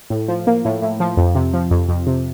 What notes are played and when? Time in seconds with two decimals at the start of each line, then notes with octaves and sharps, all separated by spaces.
0.10 A2
0.28 F3
0.47 A#3
0.65 A2
0.82 A2
1.00 F3
1.17 F2
1.35 C3
1.54 F3
1.71 F2
1.89 F2
2.07 C3